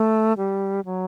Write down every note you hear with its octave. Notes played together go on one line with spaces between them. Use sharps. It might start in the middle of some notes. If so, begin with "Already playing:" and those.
Already playing: A3
G3
F#3